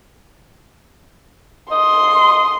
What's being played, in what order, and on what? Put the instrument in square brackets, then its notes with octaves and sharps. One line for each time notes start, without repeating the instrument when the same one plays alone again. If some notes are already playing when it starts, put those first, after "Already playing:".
[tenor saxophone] D#5 [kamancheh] C6